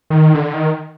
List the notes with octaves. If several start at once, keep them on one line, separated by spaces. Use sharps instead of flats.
D#3
D3
D#3